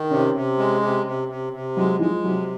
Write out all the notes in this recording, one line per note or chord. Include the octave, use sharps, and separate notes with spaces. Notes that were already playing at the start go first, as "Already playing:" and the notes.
Already playing: D#3
C3 C#4
C3
G#3
C3
C3
C3
C3
F#3 G#3
F3 G#3
C3 F#3